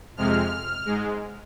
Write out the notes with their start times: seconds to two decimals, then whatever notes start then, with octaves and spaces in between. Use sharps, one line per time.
0.17 F2 C3 G#3 F6
0.86 G#2 G#3